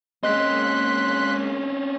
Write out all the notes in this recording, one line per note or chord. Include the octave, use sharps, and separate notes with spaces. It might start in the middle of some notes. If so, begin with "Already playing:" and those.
G#3 A#3 C4 C#4 D#5 C6 F#6 B6